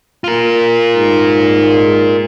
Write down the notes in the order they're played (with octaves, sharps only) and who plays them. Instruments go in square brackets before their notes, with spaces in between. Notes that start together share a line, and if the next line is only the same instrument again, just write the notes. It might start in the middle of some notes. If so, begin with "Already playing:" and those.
[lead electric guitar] F4 A#4
[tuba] G#2